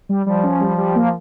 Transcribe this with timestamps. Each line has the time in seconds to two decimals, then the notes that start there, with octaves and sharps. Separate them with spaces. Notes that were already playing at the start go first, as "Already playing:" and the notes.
0.09 G3
0.26 F3 G3
0.43 C#4
0.60 G3
0.78 G3
0.95 A#3